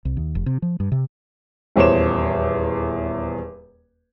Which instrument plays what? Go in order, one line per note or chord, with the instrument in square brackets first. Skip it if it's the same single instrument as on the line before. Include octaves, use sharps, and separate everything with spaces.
[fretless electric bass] C2
D#2
F1
C3
F3
G2
C3
[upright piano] D#1 E2 C5 C#5 E7